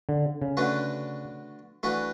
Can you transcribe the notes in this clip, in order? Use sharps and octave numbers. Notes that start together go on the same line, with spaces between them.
D3
C#3
D3 A3 D4 F#4 B4
E3 A3 D4 F#4 B4